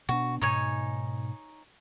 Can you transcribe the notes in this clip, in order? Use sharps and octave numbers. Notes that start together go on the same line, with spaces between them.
B2 B3 D4 F#4
G#2 B2 D#4 C#5 G#5